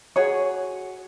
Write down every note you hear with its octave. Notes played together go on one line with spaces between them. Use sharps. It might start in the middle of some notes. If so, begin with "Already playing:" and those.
F#4 G#4 C#5